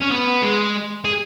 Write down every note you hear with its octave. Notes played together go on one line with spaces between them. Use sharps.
C#4
B3
G#3
G#4